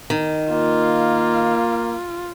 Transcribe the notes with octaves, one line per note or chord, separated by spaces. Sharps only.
D#3
A#3 F4